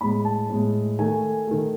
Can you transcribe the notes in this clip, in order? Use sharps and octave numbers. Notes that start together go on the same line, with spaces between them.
A2 G#3 B5
A5
A2 G#3
D#3 A3 G#5
D#3 A3